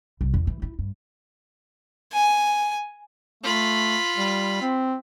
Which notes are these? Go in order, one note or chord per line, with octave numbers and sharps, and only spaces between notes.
C2
E2
E3
E4
G2
G#5
A3 F4 B5
G3
C4